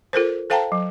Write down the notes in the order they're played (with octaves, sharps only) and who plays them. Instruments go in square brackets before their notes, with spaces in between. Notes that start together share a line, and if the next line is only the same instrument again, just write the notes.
[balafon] F4 A4 A#4 C5
A4 C5 F5 G5 A5 A#5
F#3